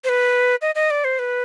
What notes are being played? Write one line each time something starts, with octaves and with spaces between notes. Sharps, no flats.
C5
B4
D#5
D#5
D5
C5
B4